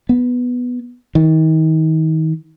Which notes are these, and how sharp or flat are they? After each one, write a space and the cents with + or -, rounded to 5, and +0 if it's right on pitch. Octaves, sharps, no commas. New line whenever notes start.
B3 +0
D#3 +35